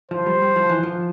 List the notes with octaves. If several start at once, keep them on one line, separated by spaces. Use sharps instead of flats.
F3 C5
G3
G3
F3
E3
F3